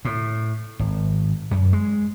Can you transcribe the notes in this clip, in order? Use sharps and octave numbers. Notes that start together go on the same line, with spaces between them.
A2
G#1
F#2
G#3